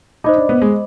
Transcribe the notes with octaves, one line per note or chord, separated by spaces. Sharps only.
D#4 C5 D#5 B5 D6
D4
B3
G#3